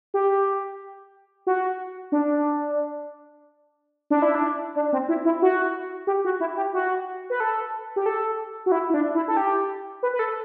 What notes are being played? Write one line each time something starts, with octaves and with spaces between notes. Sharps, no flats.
G4
F#4
D4
D4
E4
D4
D4
C4
E4
E4
F#4
G4
F#4
E4
G4
F#4
B4
A4
G4
A4
F#4
E4
E4
D4
E4
A4
G4
B4
B4
A4